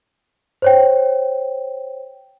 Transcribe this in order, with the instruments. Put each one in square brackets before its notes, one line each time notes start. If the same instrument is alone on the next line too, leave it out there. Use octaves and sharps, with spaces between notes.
[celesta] C5 C#5 G5